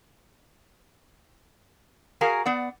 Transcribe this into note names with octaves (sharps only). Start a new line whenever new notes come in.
F#4 G#4 A#4 F5 G#5
B3 D5 F#5